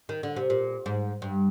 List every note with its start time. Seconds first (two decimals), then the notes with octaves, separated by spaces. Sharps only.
0.09 D#3
0.23 D3
0.36 C3
0.50 A#2
0.86 G#2
1.22 G2